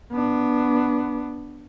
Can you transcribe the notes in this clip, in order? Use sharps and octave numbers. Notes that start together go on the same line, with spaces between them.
B3 D4